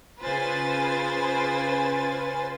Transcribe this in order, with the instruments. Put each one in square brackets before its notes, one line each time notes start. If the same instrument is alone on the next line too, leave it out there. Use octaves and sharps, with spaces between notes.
[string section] C#3 F4 B4 C5 G#5 A6